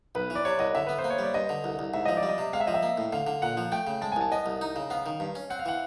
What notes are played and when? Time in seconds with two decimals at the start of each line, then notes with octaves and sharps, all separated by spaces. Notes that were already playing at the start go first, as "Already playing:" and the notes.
0.15 B1 B4
0.30 E3
0.35 D5
0.45 C3 C#5
0.59 C2 D#5
0.75 D3 E5
0.86 B3 B4
0.99 C5
1.04 A#3
1.10 C#5
1.19 G3 D5
1.34 G2 D#5
1.49 D3
1.64 C2
1.79 C2
1.94 G#2 E5
2.06 F3 D#5
2.17 D5
2.23 G3
2.29 D#5
2.38 C3
2.53 G#3 F5
2.60 E5
2.67 F3 D#5
2.74 E5
2.83 A#3
2.98 A2
3.13 D3 F5
3.27 D3
3.42 A#2 F#5
3.57 F3
3.72 A3 G5
3.87 C#3
4.02 G#3 A5
4.12 G#5
4.16 C2 A5
4.32 B3 D#5
4.46 C2
4.61 D#4
4.76 C#3
4.90 B3 F5
5.06 D#3
5.20 G2
5.35 C#4
5.50 C4 F#5
5.59 F5
5.66 E3 F#5